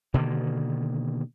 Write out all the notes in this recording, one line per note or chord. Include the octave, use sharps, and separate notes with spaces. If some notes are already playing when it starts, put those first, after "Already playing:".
B2 D3 D#3 A#3